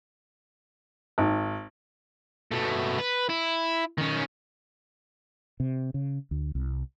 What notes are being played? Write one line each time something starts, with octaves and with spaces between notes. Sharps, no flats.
G#1
B2 A3
B4
E4
D#3 C#4
C3
C#3
D2
C2